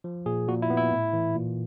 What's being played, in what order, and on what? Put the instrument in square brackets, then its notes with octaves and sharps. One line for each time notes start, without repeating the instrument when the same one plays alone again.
[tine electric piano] F3
A#2 G#4
A#2 F#4
E4
B3
E4
A2
E3
A#2